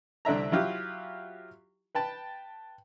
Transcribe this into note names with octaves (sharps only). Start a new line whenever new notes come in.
C2 D3 D4 E5 A#5
F#3 E4 F4 G4
B4 G5 A5